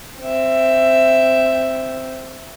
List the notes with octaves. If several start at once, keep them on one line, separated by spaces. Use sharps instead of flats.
C4 E5